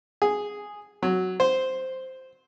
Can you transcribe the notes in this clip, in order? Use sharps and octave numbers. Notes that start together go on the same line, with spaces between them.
G#4
F#3
C5